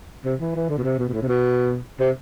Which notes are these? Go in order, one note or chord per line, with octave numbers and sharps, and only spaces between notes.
C3
E3
E3
D3
B2
C3
B2
B2
A2
C3
B2
C3